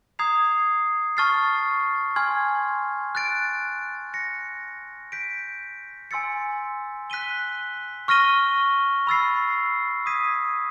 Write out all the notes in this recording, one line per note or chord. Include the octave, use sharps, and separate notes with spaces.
A#5 D#6 G#6 C7 F7
A5 C#6 F6 A6 C7
G#5 C6 F6 G#6
F#6 A6 D7
F#6 A#6 C#7
G6 B6 D7
G#5 C6 E6 A6 C#7
F#6 B6 D#7 G7
C#6 F6 A#6 D#7 G7
B5 E6 A6 C7
D#6 G#6 B6 D#7